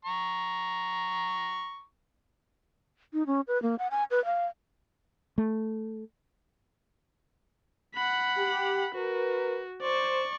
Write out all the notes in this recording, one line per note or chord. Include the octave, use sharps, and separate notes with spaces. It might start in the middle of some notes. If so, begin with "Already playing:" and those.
A#5 C#6
D#4
C#4
B4
A#3
F#5
G#5
B4
F5
A3
F#5 B5
G4
F#4 A#4 B4
C5 D5 C#6